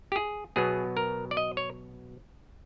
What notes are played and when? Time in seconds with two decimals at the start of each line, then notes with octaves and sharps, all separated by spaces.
0.12 G4
0.16 G#4
0.56 B2 F#3 B3 G#4
0.97 A#4
1.31 D5
1.37 D#5
1.57 C#5